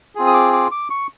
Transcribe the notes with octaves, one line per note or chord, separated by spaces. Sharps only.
C4 F4 G#4
D#6
D6
D6
D6
C#6